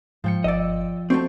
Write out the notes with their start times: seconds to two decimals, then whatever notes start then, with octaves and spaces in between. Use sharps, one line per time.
0.24 G#2 F3 G5 C#7
0.44 G1 D5 D#5 E6
1.10 A3 C4 F#4 C5 C#6